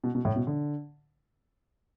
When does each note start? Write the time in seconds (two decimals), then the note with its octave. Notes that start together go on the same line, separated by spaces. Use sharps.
0.04 B2
0.15 B2
0.25 A2
0.36 B2
0.47 D3